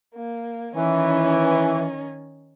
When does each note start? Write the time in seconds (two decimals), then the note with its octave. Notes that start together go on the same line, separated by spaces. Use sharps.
0.15 A#3
0.75 D#3 E3 C#4 D#4